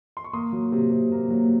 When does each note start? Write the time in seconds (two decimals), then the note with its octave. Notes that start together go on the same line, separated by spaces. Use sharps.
0.17 C6
0.24 C#6
0.33 A#3 C6 D#6
0.53 F#3
0.72 C3
0.91 C3
1.12 A#3
1.30 F#3